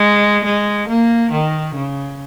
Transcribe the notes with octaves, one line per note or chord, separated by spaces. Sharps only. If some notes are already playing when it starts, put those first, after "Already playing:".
Already playing: G#3
G#3
A#3
D#3
C#3